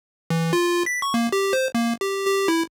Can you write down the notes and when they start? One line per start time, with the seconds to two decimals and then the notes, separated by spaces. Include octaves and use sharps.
0.30 E3
0.53 F4
0.86 B6
1.02 C#6
1.14 A#3
1.32 G4
1.53 C5
1.75 A#3
2.01 G4
2.27 G4
2.48 E4